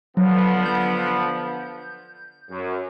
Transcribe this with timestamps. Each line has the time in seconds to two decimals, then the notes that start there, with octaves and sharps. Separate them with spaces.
0.17 D3 F3 F#3 B3
0.66 G6
2.49 F#2